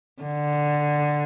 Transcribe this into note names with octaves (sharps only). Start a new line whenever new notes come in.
D3